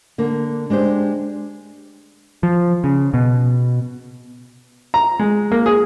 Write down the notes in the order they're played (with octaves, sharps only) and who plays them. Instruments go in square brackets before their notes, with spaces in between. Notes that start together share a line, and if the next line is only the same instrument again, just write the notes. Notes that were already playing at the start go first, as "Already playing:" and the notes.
[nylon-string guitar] D3 A#3
G#3 D4 G4 C5
[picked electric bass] F3
C#3
B2
[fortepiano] A#5
G#3
A#3
G#4